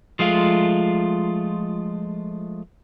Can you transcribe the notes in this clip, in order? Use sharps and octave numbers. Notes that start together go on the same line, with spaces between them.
F3 G#3 A3 F4